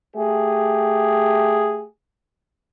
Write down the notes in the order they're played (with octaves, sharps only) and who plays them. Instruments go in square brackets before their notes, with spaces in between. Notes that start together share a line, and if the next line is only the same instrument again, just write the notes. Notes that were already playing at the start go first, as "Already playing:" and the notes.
[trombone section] A3 G4 G#4